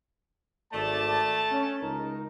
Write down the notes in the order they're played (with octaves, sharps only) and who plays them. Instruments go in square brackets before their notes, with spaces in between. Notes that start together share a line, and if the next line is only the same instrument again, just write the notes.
[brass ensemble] G#1 D5 [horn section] A3 A5
[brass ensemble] C#4
C#2 D#4 A#4